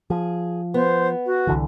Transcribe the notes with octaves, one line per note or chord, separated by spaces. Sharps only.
F3 G#4
B3 C5
F#4
C2 D3 E3